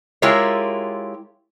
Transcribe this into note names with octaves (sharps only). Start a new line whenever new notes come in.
G#3 E4 F4 G4 A#4 C#5